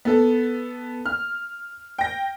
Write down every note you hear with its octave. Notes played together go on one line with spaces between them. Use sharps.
B3 A4
F6
G5 A#6